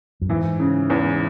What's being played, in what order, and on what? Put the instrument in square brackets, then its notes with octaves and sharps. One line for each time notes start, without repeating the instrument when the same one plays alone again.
[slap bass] F#2
[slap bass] G#2 [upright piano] E3
[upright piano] C#3
E2